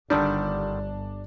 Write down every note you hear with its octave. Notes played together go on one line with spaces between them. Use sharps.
G1 D3 D#3 G3 D4